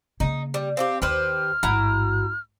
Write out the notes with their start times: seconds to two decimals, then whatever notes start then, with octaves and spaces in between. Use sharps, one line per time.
0.20 C#3 A#3 D#4
0.54 G3
0.77 C4 F#4 G4 F5
1.02 D#2 G4 B4 C5 F6
1.63 A1 G#2 E4 F#4 A#5